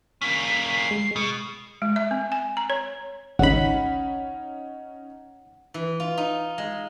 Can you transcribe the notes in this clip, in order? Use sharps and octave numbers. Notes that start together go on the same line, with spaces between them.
A#3 C#4 B6
C7
G#3
B2 C#6
G#3
E5
C4
G#5
A#5
C#5
G#1 C#2 C#4 D#4 F#5 B5
E3
F4
D#4
G#3